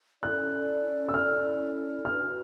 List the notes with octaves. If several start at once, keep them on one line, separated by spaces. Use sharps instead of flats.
C#4 E4 A4 D5 F#6
E6
F6
D4 F#4 B4 F6